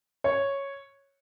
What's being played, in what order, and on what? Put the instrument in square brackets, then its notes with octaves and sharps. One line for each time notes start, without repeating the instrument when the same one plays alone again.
[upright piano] C#5